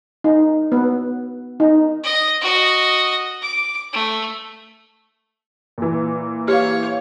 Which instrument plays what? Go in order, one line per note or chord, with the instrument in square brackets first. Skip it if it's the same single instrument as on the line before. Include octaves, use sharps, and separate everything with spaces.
[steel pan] D#4
B3
D#4
[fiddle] D#5
F#4 D#5
D6
A3
[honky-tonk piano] A#2 E3
[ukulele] E4 F5 [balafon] G4 [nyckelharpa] C#5